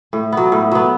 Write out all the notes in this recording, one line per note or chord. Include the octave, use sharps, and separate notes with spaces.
A2
F#3 B3
A2
F#3 B3